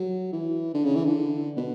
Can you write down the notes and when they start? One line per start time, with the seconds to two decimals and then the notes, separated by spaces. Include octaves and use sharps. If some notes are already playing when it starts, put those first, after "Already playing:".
Already playing: F#3
0.32 E3
0.74 D3
0.84 C#3
0.95 E3
1.05 D3
1.57 B2